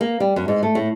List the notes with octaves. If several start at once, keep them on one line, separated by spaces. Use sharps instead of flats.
A#3
G3
F#2
G#2
A3
A2